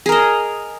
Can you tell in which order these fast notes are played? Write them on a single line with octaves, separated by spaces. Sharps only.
G#4 A#4 D#5